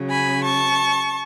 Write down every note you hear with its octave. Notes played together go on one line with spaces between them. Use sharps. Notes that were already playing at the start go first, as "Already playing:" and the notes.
Already playing: C#3 F#3
G#5 B5
A5 C#6